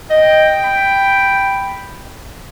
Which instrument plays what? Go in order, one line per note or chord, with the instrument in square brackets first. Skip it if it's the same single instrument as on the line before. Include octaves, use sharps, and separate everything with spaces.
[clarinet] D#5 [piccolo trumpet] G5
[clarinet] B5